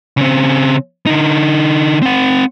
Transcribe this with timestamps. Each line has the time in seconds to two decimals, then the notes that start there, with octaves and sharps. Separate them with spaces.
0.17 C#3 C4
1.06 D3 D#4
2.03 C4 F#5